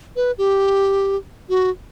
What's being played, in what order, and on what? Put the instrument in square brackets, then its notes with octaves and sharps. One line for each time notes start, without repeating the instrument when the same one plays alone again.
[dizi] B4
G4
F#4